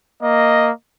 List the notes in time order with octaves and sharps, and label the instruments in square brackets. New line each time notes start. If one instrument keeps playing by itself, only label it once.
[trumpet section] A#3 D#5